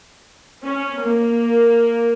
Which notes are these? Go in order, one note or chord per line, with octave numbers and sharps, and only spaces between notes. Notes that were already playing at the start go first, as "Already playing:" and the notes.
C#4
A#3